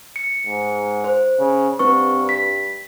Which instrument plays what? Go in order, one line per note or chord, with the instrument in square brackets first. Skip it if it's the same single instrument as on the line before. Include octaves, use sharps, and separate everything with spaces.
[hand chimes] C#7
[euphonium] G#2
[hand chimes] C5
[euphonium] C#3
[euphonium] G2 [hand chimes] C4 B4 C#6
[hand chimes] B6